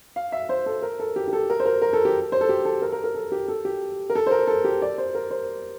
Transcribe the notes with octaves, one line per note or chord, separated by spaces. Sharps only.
F5
E5
C5
A4
A#4
A4
G4
G4
A4
A#4
C5
A#4
A#4
A4
G4
C5
A4
G4
A4
A#4
A#4
A#4
A4
G4
A4
G4
A#4
A4
C5
A#4
A4
G4
D5
C5
A#4
C5